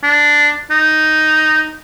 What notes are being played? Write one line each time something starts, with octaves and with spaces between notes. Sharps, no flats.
D4
D#4